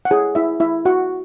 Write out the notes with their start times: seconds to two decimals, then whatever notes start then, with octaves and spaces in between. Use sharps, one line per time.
0.05 F#5
0.10 E4 G#4 A4 C#5 G#5
0.35 E4 E5
0.60 E4 E5
0.85 F#4 F#5